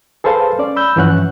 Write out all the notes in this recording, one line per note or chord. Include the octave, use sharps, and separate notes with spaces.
G#4 A4 B4 C5 F5 A5
C#4 D5
B5 E6 G6
G2 E3 F3 C#4 F#5 F#6